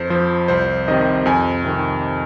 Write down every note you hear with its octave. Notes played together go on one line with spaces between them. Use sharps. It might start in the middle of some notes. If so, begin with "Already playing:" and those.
Already playing: F2 C5
F3 C5
C2 C5
C3 D#3 D#5
F2 G#5
C3 D#3